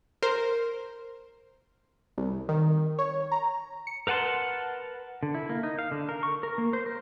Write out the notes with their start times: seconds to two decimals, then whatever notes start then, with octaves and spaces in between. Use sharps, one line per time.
0.23 A#4 C5
2.18 C2
2.49 D#3
2.99 C#5
3.32 A#5
3.87 C#7
4.07 A#4 B4 F#5 A5 C6
5.23 D3
5.35 E4
5.49 A#3
5.63 D#4
5.79 F5
5.91 D3
6.09 A#4
6.23 C#6
6.43 A#4
6.58 A#3
6.73 C5
6.86 A#4